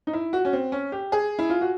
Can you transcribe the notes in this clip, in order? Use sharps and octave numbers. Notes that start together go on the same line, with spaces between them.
D#4
E4
F#4
C#4
C4
C#4
G4
G#4
E4
F4
F#4